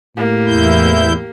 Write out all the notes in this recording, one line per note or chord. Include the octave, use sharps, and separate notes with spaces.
A2 A#3 G4
E2 E4 G6